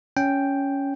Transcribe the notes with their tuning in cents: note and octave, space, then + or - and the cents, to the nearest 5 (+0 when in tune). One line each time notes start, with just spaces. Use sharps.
C#4 +10 G5 +0